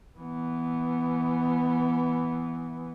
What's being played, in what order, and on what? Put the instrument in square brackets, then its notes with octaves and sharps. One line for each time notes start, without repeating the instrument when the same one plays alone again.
[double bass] E3 B3